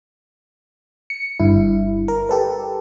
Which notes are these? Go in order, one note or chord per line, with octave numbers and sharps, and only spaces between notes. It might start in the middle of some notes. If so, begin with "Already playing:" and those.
C#7
G1 G2 E4
A#4
G4 A4 B4